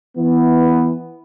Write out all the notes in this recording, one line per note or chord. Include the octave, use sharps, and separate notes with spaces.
E3 B3